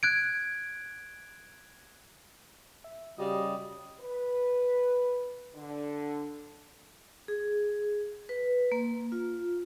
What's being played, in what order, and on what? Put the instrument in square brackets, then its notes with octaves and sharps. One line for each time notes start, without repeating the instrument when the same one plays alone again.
[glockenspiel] F#6 G#6 D7
[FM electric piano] E5
[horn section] C#3 G3 D#5 [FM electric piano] F#4 G4 F5
[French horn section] B4
D3
[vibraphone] G#4
B4
A#3
F4